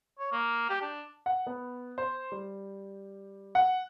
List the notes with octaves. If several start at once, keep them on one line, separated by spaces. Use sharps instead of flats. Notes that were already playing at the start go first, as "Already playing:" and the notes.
C#5
A#3
G4
D4
F#5
B3
C5
G3
F#5